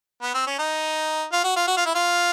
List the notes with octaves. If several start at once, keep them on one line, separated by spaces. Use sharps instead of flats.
B3
C4
C#4
D#4
F4
F#4
F4
F#4
F4
E4
F4